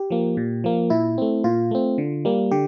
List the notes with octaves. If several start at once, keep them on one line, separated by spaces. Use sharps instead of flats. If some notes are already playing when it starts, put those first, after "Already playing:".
Already playing: G4
F3 A#3
A#2
F3 A#3
A#2 E4
A3 C4
A#2 F4
A3 C4
D3
G3 A#3
D3 G4